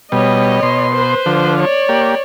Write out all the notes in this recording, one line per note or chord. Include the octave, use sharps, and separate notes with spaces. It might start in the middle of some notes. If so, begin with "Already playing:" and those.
B2 G3 C#5 D#5
B2 C6
B4 C5
D3 F3
C#5 D5
A#3 G4